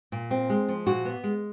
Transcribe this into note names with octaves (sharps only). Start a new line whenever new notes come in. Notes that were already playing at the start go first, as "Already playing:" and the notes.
A#2
C4
G#3
F3
A#2 F#4
B3
G#3